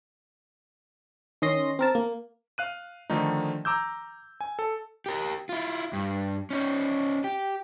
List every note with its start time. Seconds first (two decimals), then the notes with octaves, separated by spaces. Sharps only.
1.42 D#3 C#4 D#5 C6 A#6
1.79 C4 A#4 A5
1.95 A#3
2.58 F5 F#6 D#7
3.10 D3 D#3 F3 A3 D#4
3.65 A#5 D6 E6 G6
4.41 G#5
4.59 A4
5.06 G4 A#4
5.49 E4 F4
5.93 G2
6.51 C#4 D#4
7.24 G4